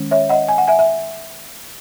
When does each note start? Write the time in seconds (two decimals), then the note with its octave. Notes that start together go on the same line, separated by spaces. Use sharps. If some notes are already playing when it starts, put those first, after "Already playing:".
Already playing: D#3 G#3 C#4
0.11 C#5 E5
0.29 D#5 F#5
0.49 G#5
0.58 F#5
0.68 E5 G#5
0.79 E5